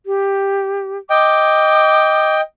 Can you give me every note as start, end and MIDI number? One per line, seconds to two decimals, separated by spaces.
0.06 0.98 67
1.10 2.41 75
1.10 2.41 79
1.10 2.36 86